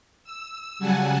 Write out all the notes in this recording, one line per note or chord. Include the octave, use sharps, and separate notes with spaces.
E6
C#3 F#3 G3 F#5 G#5 A5